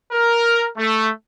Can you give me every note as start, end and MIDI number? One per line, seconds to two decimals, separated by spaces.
0.12 0.67 70
0.77 1.09 57